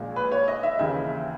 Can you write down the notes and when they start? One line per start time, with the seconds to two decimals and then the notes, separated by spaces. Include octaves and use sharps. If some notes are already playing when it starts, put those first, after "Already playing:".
Already playing: A#1 A#2 G#3
0.16 B4
0.32 C#5
0.48 D#5
0.63 E5
0.79 D#2 C#3 E3 E5